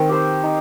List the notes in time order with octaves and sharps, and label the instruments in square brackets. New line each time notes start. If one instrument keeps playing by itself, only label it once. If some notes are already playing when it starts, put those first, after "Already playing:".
Already playing: [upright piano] D#3 [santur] C4
[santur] G4 C5
D#4